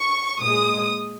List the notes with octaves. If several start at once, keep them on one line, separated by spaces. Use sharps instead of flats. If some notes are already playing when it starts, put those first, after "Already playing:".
Already playing: C#6
A#2 G#3 D#6